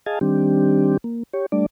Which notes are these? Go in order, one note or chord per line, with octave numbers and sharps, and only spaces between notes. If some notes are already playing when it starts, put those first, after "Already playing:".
G#4 D#5 F5 G#5 A5
D#3 G3 C4 D4 G4
A#3
G4 C#5
G3 A3 D4 D5